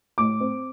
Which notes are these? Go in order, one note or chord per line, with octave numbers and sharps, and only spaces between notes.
A2 D6
C4